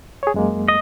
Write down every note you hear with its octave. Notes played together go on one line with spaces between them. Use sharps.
G#4 C#5
F#2 G#3 A#3
D#5